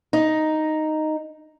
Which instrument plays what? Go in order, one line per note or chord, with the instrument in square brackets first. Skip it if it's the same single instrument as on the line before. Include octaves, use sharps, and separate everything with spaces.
[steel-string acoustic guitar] D#4